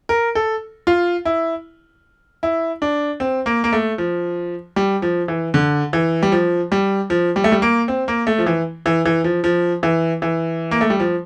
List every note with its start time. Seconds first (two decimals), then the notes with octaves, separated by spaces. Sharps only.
0.09 A#4
0.35 A4
0.87 F4
1.25 E4
2.43 E4
2.82 D4
3.20 C4
3.46 A#3
3.64 A#3
3.73 A3
3.98 F3
4.76 G3
5.02 F3
5.28 E3
5.54 D3
5.93 E3
6.22 G3
6.32 F3
6.72 G3
7.10 F3
7.36 G3
7.44 A3
7.52 G3
7.62 A#3
7.88 C4
8.08 A#3
8.27 A3
8.39 F3
8.46 E3
8.86 E3
9.05 E3
9.24 F3
9.44 F3
9.83 E3
10.22 E3
10.71 A#3
10.81 A3
10.90 G3
11.00 F3